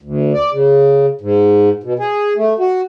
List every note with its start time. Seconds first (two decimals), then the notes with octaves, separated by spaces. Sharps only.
0.02 D2
0.34 D5
0.52 C#3
1.21 G#2
1.84 B2
1.99 G#4
2.37 A3
2.59 F#4